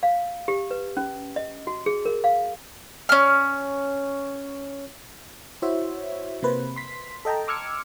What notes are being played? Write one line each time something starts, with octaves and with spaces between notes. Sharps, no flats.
F5
G4
B4
C#4
D#5
F#4
G#4
A#4
F5
C#4 F6
E4 F#4 C5 C#5 E5
C3 A#3 B4 C5
C6 B6
A4 D#5 G5 A5 A#5
C6 D6 E6 F6 G#6 C#7